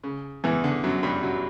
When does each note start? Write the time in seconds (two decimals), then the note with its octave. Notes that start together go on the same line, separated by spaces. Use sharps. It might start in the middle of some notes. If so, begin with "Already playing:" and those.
0.03 C#3
0.44 E2 E3
0.64 D3
0.84 F#2 F#3
1.03 G2 G3
1.23 F#2 F#3